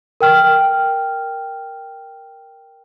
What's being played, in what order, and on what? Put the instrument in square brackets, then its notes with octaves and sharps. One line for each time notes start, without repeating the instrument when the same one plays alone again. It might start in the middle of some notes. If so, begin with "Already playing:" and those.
[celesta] A#4 G5 F6